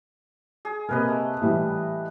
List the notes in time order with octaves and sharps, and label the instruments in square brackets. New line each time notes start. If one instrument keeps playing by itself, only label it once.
[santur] G#4
[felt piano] C3 A#3 [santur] A#4 B4 D#5
[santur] A3
[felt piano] A2 E3 G3